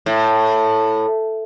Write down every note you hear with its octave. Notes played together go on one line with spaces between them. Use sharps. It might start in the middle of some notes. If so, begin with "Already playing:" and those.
A2